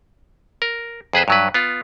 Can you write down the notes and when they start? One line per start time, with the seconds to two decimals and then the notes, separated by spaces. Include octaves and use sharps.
0.62 A#4
1.13 F2 G#4 B4 C5
1.28 G2 F#3 B4
1.54 B3 F4